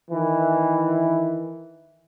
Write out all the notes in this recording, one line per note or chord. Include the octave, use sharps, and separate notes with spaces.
D#3 E3